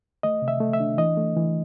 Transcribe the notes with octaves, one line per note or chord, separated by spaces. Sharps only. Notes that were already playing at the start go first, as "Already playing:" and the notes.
A3 D#5
C3
E5
A3
E5
D4
E3 D#5
A3
E3